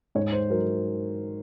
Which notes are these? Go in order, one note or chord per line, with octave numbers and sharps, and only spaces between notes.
G#2 C#5
C5
F#3 A#4